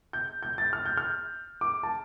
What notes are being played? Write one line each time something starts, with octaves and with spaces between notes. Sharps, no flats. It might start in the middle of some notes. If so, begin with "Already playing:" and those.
G6
G6
A6
F6
G6
F6
D6
A5